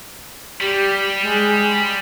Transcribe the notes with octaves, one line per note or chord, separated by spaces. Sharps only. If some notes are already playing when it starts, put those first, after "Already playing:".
G3 G4
G#3